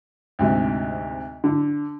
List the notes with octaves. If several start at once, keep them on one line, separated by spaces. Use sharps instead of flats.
D2 G#2 C3
D3